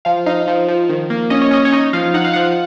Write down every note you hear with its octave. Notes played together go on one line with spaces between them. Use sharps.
F3 F5
D#4 F5
F3
F3
D#3
A#3
C#4 D#5
C#5
C#4 D#5
C#5
D#4 D#5
F3 F5
D#4 F#5
F5
F3 F#5